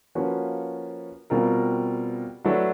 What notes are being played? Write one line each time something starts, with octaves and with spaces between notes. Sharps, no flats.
F3 A#3 C#4 F#4 B4
B2 G3 C4 F4 A#4
F#3 A3 D4 F#4 B4